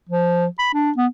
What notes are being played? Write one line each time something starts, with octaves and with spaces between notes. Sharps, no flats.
F3
B5
D4
B3